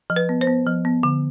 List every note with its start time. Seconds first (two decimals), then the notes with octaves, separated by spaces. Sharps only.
0.10 F3
0.16 B4
0.29 B3
0.41 C5
0.47 B3
0.67 F3
0.85 B3
1.03 D3